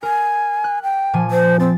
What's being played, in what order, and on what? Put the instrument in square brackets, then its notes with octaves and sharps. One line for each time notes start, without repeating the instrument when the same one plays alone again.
[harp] A#4 [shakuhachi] G#5
[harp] F#6
[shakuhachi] G5
[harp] A#2 F3 G#5
[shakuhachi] C5
[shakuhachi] C4 [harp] A6